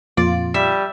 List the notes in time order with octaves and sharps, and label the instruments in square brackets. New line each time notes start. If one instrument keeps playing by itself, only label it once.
[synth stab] F2 A#2 F4 [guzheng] D5
[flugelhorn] G3 [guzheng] E5